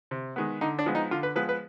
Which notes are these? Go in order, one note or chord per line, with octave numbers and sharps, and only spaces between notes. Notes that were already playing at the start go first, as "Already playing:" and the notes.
C3
D#3 G#3 B3
D3 D#4
D4
F3 G#3 B3
D#4
D3 F4
B4
F3 G#3 B3 B4
B4